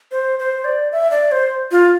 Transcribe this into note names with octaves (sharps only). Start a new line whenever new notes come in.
C5
C5
D5
E5
D5
C5
F4